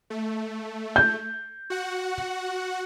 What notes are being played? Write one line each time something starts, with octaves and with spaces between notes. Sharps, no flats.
A3
G6
F#4 F#5